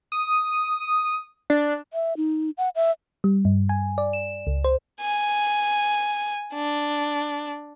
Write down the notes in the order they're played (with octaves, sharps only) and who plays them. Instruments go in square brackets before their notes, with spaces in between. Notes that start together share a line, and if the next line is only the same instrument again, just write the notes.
[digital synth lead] D#6
D4
[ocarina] E5
D#4
F#5
E5
[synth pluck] G3
G2
G#5
D5
E7
C#2
C5
[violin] G#5
D4